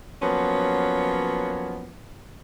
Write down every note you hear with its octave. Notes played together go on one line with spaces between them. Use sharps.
F3 F#3 A#3 B3 C#4